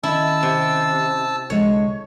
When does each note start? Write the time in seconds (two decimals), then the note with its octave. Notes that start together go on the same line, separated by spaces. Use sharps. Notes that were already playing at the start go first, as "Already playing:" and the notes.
0.03 D#3 C#4 E4 D#5 A5 E6
0.43 C3
1.50 C2 D3 G#3 C#5